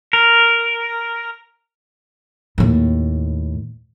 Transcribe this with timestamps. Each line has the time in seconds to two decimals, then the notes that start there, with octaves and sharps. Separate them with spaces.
0.13 A#4
2.58 D#2 A2